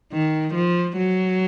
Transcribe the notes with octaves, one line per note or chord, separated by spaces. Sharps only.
D#3
F3
F#3